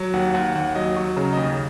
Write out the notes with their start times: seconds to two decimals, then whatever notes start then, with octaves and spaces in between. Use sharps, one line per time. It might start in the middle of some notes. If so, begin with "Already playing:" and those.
Already playing: F#3
0.13 D#2 F#5
0.34 D#2 F#5
0.55 D#2 F#5
0.75 F#3 D#5
0.96 F#3 C#6
1.16 C#3 A#5
1.33 D#2 D#5